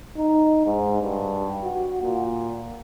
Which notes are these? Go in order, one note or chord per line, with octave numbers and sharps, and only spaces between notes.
D#4
G#2
G2
F#4
A#2